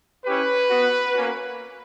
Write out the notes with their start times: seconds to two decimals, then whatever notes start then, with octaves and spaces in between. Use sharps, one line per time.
0.25 C#4 E4 G4 B4
0.69 B3 F#4
1.13 A#3 C#4 F#4